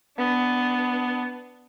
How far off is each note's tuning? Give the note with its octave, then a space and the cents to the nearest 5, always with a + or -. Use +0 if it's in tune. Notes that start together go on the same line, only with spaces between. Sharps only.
B3 +10 D4 +0